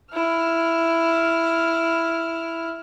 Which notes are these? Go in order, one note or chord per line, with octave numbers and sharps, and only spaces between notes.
E4 F6